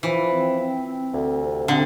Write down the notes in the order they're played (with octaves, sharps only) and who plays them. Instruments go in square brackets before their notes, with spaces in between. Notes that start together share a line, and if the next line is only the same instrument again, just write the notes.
[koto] E3 [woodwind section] F3
[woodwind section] C4
C4
C4
D2
C3
[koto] D3 [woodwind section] C4